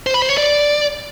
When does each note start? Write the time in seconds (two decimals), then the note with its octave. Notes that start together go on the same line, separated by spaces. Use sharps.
0.06 C5
0.14 B5
0.22 C5
0.30 C#5
0.38 D5